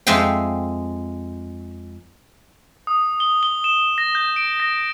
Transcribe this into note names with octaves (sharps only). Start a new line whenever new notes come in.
F2 G#3 E5 F5 G5
D#6
G7
G7
E7
A#6
G6
D7
A#6